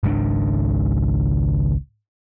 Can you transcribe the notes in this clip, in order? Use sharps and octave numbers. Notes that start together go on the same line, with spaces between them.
G#1 C#2 G#2 D4